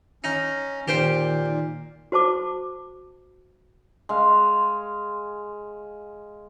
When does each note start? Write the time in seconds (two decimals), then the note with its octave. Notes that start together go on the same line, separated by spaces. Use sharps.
0.24 C#4 D#4
0.88 A#2 D#3 G4 C5 G5
2.12 F#4 C5 A5 D6
4.09 G#3 F5